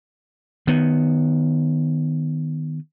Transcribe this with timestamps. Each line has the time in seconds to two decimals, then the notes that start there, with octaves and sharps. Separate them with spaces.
0.67 D#3 B3